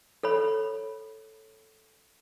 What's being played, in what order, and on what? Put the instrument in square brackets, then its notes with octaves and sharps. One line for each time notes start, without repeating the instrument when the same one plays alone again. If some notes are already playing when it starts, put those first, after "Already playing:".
[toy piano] A4 C#5 B5